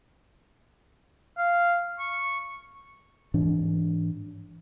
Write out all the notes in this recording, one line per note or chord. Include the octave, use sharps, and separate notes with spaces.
F5
C#6
G#2 E3 D4